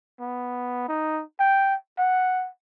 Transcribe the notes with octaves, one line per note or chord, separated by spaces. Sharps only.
B3
D#4
G5
F#5